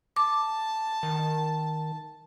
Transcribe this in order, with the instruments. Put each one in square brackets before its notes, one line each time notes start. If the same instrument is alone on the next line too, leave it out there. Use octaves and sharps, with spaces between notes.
[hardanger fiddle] A5 [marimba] D6
[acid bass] D#3